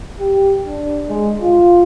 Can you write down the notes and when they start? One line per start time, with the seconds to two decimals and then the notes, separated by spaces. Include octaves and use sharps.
0.19 G4
0.66 D4
1.09 G#3
1.41 F4